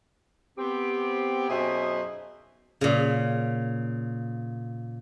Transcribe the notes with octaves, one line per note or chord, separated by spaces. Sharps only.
B3 C4 G4
F#2 B2 D#4 G#4 C5 E5
A#2 C#3